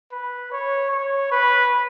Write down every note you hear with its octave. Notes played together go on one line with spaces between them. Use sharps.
B4
C#5
C#5
B4